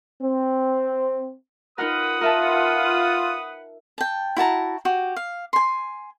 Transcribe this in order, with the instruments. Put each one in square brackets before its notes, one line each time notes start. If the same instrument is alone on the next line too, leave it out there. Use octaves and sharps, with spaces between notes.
[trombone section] C4
[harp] D#4 F4 A#4 [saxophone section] B4 F#5 [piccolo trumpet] D#6
[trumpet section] F4 [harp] A#4 E5 A5
[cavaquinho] G5 A5
E4 F#4 A5 A#5
F#4 G4
F5
G#5 C6